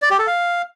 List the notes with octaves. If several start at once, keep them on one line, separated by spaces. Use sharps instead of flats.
D5
G4
A4
F5